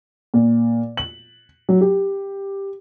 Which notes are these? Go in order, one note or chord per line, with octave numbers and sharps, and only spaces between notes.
A#2
F#7
F#3
G4